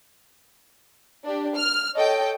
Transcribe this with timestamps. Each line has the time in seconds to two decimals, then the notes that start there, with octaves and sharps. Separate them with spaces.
1.25 D4 G4
1.56 F6
1.96 A4 C#5 D#5 G5